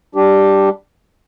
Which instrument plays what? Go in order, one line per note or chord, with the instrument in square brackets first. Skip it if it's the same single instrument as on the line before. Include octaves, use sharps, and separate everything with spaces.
[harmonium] G3 D4 G4